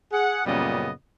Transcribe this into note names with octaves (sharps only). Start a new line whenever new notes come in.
G#4 F#5
F#2 A#2 C#3 G3 B3 D#5